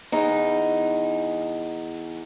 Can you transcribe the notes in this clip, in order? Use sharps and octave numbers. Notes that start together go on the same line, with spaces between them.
E2 D#4